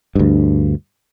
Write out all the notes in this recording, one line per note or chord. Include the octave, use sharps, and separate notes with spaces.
D2 G2